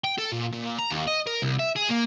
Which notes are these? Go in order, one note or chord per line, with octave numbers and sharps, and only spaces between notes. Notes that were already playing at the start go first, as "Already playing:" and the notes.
G5
A4
A#2
A#2
A#5
D#2
D#5
A#4
C2
E5
G#4
A#3